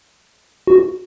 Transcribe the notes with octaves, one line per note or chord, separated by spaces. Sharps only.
F#4